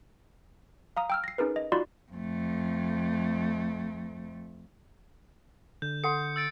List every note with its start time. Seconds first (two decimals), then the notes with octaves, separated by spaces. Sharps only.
0.97 F5 A#5 D#6
1.10 G5 E6 F6
1.24 A#6 C7
1.38 C#4 D#4 G#4 A#4 B4
1.56 D#5
1.72 D#4 F4 F#4 D5 B5 C6
2.12 F2 A3
5.82 D3 G6
6.04 A4 F#5 C6 C#7
6.36 E6 A6 D7